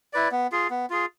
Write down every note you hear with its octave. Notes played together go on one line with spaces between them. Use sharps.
E4 B4 D5
B3
F4 G#4
B3
F4 G#4